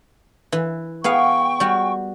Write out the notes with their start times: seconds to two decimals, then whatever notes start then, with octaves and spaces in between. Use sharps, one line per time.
0.52 E3
1.04 B3 G#4 F5 G5 C#6
1.60 G3 F#4